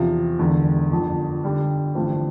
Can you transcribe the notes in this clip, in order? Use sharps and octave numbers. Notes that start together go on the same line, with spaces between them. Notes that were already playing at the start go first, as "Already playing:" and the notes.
Already playing: E2 C3 F3
E1 E2 D3
G1 F2 D3
D3 G3 D4
A1 G2 D3 F3 C4